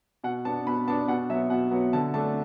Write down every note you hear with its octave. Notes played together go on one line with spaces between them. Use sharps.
B2 F#5
B3 D4 A5
B2 B5
B3 D4 A5
B2 F#5
F#3 B3 E5
B2 F#5
F#3 B3
D3 A5
A3 D4 A5